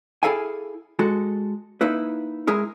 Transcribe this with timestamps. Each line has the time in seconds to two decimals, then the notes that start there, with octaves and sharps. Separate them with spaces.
0.23 E4 G#4 A4 F5 G5 G#5
0.99 G#3 F#4 A4
1.81 A#3 D#4 E4 B4
2.47 G#3 E4 G#4 A#4